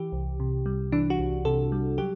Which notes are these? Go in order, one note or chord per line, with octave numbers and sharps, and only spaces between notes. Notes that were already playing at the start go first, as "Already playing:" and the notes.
Already playing: E3 G4
C2
C3
G3
E3 D4
F#4
C2
C3 A4
G3
F#3 G4